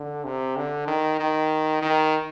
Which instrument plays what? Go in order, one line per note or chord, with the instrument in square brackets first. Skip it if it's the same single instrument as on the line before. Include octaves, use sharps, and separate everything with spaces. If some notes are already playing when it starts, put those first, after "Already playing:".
Already playing: [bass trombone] D3
C3
D3
D#3
D#3
D#3